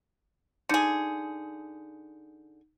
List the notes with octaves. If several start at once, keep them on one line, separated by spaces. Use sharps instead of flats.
D3 D#4 G#4 G6 C#7